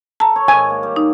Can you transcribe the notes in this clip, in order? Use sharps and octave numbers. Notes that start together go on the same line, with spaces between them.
A4 A5 A#5
C#5
G#2 D#3 G#5
A#3
G3
D#4